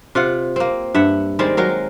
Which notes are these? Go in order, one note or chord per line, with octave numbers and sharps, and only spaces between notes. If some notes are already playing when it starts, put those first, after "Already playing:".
C3 F4 F#5
A#3 C4
G2 E5 F#5
D#3 G3 G#3 C4
F#3 G#3 A#4